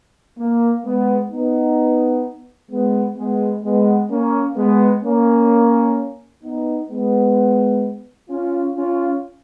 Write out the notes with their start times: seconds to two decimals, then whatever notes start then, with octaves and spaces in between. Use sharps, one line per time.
0.38 A#3
0.84 G#3 B3
1.31 B3 D#4
2.70 G#3 B3
3.17 G#3 B3
3.64 G#3 B3
4.10 A#3 C#4
4.56 G#3 B3
5.04 A#3 C#4
6.43 B3 D#4
6.90 G#3 B3
8.30 C#4 F4
8.76 C#4 F4